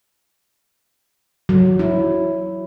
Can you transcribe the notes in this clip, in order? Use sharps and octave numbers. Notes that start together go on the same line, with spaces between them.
F#3
E4